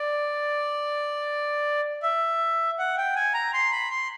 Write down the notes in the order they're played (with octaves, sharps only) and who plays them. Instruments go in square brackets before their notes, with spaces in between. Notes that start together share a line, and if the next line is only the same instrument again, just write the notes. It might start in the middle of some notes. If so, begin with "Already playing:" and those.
Already playing: [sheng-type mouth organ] D5
E5
F#5
G5
G#5
A#5
C6
B5
C6